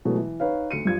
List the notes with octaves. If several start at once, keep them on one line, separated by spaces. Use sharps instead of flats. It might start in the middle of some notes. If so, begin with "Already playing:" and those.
B2 E3 F#3 G#3 A3 B3
E3
D#4 B4 C#5 F5
D2 C#7 D#7
G2 F3 G#6